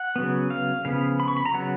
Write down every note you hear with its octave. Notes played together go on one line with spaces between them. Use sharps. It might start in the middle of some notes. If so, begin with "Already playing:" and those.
Already playing: F#5
C#3 F#3 B3
F5
C#3 F3 B3 F5
B5
C#6
B5
A#5
C#3 F#3 B3 F#5